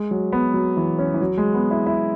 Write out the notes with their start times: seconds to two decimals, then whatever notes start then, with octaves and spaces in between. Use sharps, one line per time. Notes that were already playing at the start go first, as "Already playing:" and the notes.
Already playing: G#3
0.11 F#3
0.32 B3
0.54 F#3
0.77 E3
0.98 C#4
1.14 E3
1.21 F#3
1.38 G#3
1.54 B3
1.71 E4
1.86 E4